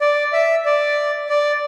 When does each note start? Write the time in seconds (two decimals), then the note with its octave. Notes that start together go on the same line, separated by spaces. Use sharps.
0.01 D5
0.33 E5
0.66 D5
1.29 D5